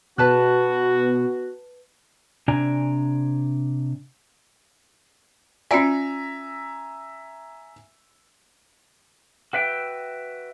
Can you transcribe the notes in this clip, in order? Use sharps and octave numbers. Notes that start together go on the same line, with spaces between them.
B2 B3 F#4 B4 A5 F#6
C3 D4 D5 G#5 A#5
C#4 F4 D5 E5 G#5 A#5
F#4 B4 E5 G5